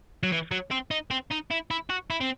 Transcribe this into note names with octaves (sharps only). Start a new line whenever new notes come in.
F#3
E3
F#3
C4
D#4
C4
D#4
E4
E4
F#4
E4
C4